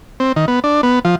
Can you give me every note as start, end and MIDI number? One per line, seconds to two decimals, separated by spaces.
0.20 0.32 60
0.36 0.46 51
0.48 0.60 59
0.64 0.81 62
0.83 0.99 59
1.05 1.15 53